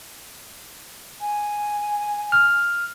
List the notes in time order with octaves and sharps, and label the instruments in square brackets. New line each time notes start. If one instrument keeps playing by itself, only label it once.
[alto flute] G#5
[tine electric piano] F6